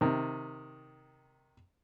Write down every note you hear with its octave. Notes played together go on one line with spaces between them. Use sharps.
C3 D#3